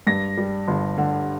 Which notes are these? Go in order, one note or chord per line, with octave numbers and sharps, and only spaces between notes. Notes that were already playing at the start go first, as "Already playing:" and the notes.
G2 A#6
G3
G1
D3